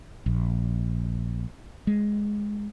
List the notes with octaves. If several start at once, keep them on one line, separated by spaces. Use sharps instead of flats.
A#1
G#3